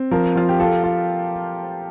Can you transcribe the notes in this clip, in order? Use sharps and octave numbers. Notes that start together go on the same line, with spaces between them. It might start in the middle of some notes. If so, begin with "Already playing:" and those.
Already playing: C4
F3 A#4
F3 F4
G4
F4 A4
F4